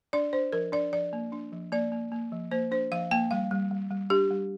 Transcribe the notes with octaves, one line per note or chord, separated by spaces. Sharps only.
D4 D5
D4 C5
F3 A#4
D4 D5
F3 D5
A#3
D4
F3
A#3 D5
A#3
A#3
F3
A#3 C5
D4 C5
F3 F5
A#3 G5
G3 F5
G3
G3
G3
D4 G4
G3